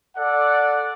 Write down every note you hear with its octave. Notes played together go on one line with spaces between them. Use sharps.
A4 D5 F#5